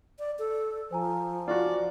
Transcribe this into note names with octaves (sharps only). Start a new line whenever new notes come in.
D5
A4
F3 C5 G#5 A#5
F4 F#4 D5